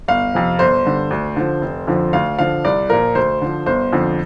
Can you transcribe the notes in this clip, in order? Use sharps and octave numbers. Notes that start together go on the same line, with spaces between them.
G1 F5
F2 C3 F3
G1 C5
G2 D3
D2
D3 F3
F1
F2 D3 F3
D2 F5
D3 F3 F5
C2 D5
A#2 F3 A#4
D2 C5
D3 F3
G1 C5
F2 D3 F3